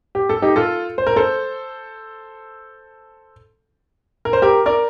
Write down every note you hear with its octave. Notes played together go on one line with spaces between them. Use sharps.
G4
A4
D#4 G4
F4 A4
C5
A#4
A4 C5
A#4
C5
G4 A#4
A#4 D5